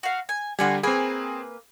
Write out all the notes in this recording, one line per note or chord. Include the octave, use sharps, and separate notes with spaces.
F#4 F5
G#5
D3 G3 F4 F#4 G#5
A#3 C4 G#4 B4 G#5